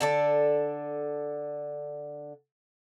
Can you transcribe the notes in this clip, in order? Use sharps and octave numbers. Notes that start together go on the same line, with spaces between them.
D3 A4 D5